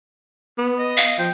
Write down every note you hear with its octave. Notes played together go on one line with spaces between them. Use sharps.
B3
D#5
F5
F3 G5